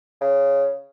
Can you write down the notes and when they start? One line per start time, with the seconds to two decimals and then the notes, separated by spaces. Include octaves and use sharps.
0.21 C#3